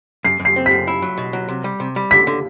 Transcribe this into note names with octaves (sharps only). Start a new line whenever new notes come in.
F#2 C7
F#2
C7
C4
F#2 B6
E4
F#3
B2
F#3
C3
G3
C3
G3
D3 B6
D3